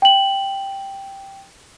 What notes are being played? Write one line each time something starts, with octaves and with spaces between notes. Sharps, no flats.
G5 F#7